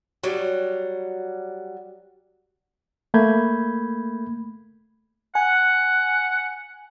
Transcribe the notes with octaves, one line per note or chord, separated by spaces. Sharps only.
F#3 G3
A3 A#3 B5 G6 G#6
F#5 G#5